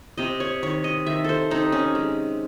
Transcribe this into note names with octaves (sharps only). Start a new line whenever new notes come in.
C3 D#5
C#5
D#3 C#5
D#5
D#3 E5
A4 C5
C3 D#4
C#4
G#3